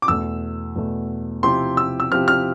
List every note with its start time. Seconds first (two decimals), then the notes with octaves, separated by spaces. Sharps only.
0.02 D6
0.08 E2 B2 A3 E6
0.76 E2 B2 A3
1.43 C3 F3 C4 E4 G4 C6
1.77 E6
2.00 E6
2.11 C3 F3 C4 E4 G4 F6
2.28 F6